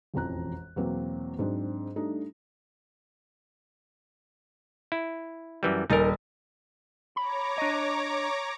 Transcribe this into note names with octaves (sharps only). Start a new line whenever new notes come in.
E1 A1 F2 A#5 F#6
E2 B2 F#3 A#3 C4
G#2 F#3 C4 D4
G3 A3 D4 D#4
E4
F#2 E3 G3
D#1 D#4 A#4 G#5 A6
C#5 A#5 B5 D6
D4 D#5